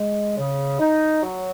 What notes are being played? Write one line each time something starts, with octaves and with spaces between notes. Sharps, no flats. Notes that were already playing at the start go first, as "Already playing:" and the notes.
Already playing: G#3
C#3
D#4
F#3